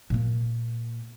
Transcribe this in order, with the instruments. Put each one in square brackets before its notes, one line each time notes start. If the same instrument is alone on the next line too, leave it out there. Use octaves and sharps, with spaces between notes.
[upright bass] A#2 A#3